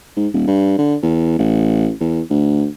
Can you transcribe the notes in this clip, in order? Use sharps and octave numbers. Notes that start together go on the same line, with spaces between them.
G#2
D#1
G2
D3
E2
A1
E2
D2